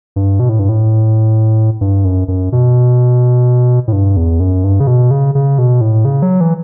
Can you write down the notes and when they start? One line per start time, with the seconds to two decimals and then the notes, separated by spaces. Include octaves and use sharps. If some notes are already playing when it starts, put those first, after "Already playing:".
0.16 G2
0.40 B2
0.49 A2
0.59 G2
0.69 A2
1.81 G2
2.05 F#2
2.28 F#2
2.52 B2
3.88 A2
3.93 G2
4.17 E2
4.40 F#2
4.64 G2
4.80 C#3
4.87 B2
5.11 C#3
5.35 C#3
5.58 B2
5.81 A2
6.05 C#3
6.22 F#3
6.41 E3